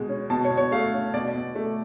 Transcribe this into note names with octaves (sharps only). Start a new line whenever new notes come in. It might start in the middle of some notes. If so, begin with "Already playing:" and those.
Already playing: B2 G#3
C#4
B2 A5
C#5
B2
C#5
A3 F5
C#4
B2 D5
B2
A3